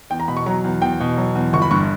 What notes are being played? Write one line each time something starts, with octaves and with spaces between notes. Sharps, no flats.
E2 G5
A#5
B2 B5
C#6
F#3 A#5
E2
E2 G5
B2
F#3
E2
G1 C#6
B5
G2 C#6